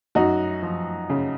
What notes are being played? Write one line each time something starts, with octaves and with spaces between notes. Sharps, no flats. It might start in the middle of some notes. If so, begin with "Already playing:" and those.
F#2 D#4 F#4
F3
C#3